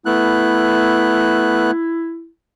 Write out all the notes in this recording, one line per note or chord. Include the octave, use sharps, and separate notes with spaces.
A3 B3 E4 F#6